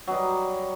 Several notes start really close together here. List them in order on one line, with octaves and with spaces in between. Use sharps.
F#3 D#4 G3